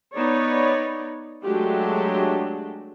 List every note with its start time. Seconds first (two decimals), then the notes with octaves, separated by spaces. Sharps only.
0.14 B3 D#4 C#5 D5
1.45 F#3 G#3 A3 D4 G4